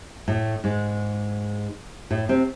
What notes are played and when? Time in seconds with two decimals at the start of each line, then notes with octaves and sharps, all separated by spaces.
0.28 A2 A3
0.64 G#2 G#3
2.11 A2 A3
2.29 C3 C4